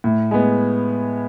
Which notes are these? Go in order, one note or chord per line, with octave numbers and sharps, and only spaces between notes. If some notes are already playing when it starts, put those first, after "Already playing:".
A2
G#3 B3